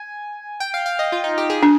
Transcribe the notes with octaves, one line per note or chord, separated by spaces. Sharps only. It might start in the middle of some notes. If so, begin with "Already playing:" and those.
Already playing: G#5
G5
F5
F5
D#5
F4
D#4
G4
G#4
D4